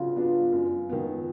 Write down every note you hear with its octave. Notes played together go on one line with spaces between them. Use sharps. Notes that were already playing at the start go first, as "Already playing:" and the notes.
Already playing: C#3 F#3 B3 D4 F4
F#3 B3 D4
F#2
D#3 F#3 B3